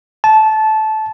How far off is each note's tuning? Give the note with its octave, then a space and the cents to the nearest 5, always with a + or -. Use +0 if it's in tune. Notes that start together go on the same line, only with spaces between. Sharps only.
A5 -15